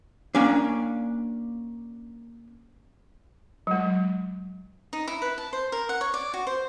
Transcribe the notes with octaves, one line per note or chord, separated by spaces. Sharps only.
A#3 C#4 D4
F#3 G#3
D#4
E4
B4
A5
C5
A#4
F#5
C#5
D5
F#4
C5